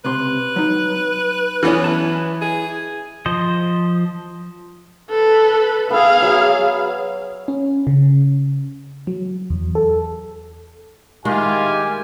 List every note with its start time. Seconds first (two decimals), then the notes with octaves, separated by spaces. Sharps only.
0.05 C#2 C3 B4 C6
0.56 F#3 D#4
1.63 E3 B3 C#4
1.84 E4 A5
2.42 G#4
3.26 F3 C5 D#5
5.10 A4 B4
5.90 B3 G#4 E5 F5
6.22 F#3
7.48 C#4
7.87 C#3
9.07 F#3
9.50 E2
9.75 A4
11.25 D#3 G#3 E4 F4 G4 G#5